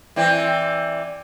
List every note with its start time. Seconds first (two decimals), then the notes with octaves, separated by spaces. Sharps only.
0.16 E3 C4 D5